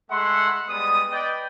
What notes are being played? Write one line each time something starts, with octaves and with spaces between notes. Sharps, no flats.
G#3 A3 E5 F#5 B5 C6
G3 G#3 B3 D#6
B4 D5 D#5 G5